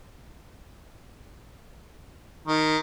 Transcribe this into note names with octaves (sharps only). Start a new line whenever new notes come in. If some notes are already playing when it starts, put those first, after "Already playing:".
D#3